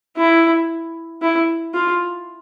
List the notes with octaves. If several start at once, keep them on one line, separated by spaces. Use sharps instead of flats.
E4
E4
F4